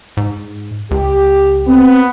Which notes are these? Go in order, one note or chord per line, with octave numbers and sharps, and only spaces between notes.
G#2
C#2 G4
B3 C4